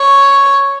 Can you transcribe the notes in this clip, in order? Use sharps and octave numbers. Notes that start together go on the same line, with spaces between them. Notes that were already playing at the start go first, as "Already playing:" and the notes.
Already playing: C#5